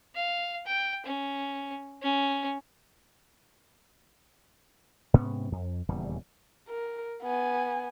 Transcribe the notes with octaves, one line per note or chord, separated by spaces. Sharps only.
F5
G5
C#4
C#4
G#2 C3 B3 C#4
F2
D#1 E2 C#3 G3
A#4
B3 G#5